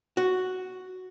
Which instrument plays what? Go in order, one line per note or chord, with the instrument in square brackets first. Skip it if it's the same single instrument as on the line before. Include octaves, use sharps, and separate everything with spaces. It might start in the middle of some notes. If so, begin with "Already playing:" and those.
[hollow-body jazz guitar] F#4